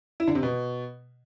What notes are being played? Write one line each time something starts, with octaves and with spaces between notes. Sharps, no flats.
E4
D3
C3
B2